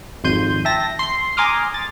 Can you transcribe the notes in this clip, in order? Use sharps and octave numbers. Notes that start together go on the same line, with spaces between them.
G#1 F2 C6 G6 D#7
E5 G5 A5 A#6
C6 C7
G#5 A#5 C6 D6 D#6 F6
A6